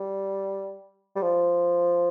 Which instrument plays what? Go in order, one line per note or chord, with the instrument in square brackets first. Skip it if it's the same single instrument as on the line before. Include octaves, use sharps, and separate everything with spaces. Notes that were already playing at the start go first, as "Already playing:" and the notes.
Already playing: [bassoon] G3
G3
F3